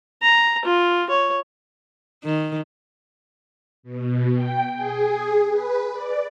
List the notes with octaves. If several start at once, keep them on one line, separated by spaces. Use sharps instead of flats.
A#5
F4
C#5
D#3
B2
G5
G#4
B4
D5